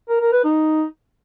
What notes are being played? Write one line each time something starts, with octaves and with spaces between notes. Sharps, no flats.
A#4
A#4
B4
D#4